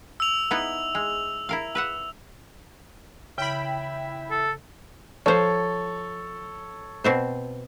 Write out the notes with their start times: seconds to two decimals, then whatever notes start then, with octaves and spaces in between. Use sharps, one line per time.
0.20 E6 F7
0.51 B3 D#4 E4
0.95 G#3
1.49 E4 A#4 F5
1.75 B4 E5 F#5
3.38 C#3 E3 E4 E5 G5 B5
4.31 A4
5.26 F3 A4 C5 C#5
7.04 B2 C4 C5